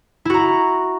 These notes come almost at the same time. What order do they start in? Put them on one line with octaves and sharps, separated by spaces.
E4 F#4 A#5